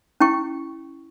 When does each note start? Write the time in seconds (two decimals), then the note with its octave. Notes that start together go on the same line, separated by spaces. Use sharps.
0.20 C#4 E4 G5 C#6